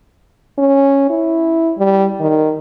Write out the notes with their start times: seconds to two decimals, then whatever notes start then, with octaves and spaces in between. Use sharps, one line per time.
0.58 C#4
1.10 E4
1.78 G3
2.20 D#3